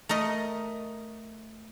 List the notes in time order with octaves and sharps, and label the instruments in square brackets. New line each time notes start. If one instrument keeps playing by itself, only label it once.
[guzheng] A3 A#4 D#5